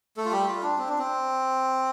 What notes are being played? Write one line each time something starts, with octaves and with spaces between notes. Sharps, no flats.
A3 A4
F4
G3 G4
F4
D4
C4
D4
C4